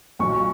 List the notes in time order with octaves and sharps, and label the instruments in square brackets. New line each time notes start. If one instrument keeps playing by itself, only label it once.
[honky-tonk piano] B1 A#2 F#3 [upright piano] C#6